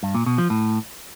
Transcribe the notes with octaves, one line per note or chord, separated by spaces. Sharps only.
G2
A#2
B2
F3
A2